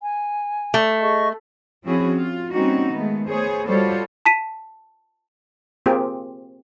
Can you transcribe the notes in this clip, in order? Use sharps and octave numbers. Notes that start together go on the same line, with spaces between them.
G#5
A3
G#4 D#5 C#6
F3 C4 C#4 E4 F#4 G#4
F4
G3 A#3 C4 C#4 D#4 F#4
D#3 G#3 A3 B3
A3 B3 G#4 C5 C#5
G3 F4 F#4 A4 C5 C#5
A5 B6 D#7
A#3 C4 F4 G4 G#4